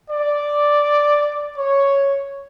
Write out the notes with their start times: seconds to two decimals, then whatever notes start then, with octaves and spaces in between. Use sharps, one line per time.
0.10 D5
1.58 C#5